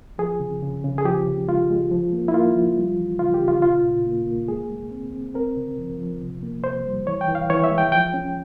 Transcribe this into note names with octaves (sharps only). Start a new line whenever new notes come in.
F3 G#4
C#3
C#3
C#3
G#4
F3 G4
C#3
G#3 F4
G#3
F3
A#3
E4
A#3 F4
F3
G3
E3
C#3 F4
G4
C#3
F4
A#2 F4
A#2
A#3
A#3
G#3 G#4
G#3
C4
C4
C4 A#4
C#3
F3
F3
C3
A#3
C3 C5
G3
E3 C#5
G5
E3
F5
E3 C#5
E5
G#3
G5
F3 G5
C#4